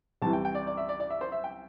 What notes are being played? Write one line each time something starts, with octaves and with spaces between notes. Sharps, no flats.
C2 C3 E3 A5
G5
G5
D5
D5
E5
D5
D5
E5
C5
E5
G5